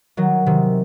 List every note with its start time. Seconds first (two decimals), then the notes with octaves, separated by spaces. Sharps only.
0.17 D#3 F#3
0.46 C3 D#3